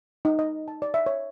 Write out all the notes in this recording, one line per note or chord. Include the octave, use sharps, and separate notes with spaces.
D#4
D#5
A5
D5
E5
C#5